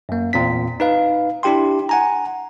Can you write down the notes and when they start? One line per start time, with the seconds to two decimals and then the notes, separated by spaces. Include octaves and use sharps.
0.09 F#2 A#3
0.33 E2 A#2 C4 B6
0.80 D#4 B4 F5
1.43 D4 E4 G4 G5 C6
1.89 F#5 G#5 A#5